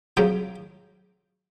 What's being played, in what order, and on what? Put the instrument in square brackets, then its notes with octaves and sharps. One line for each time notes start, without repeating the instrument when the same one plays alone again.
[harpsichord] F2 C#3 F#3 G5